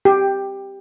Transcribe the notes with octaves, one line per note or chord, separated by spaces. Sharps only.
G4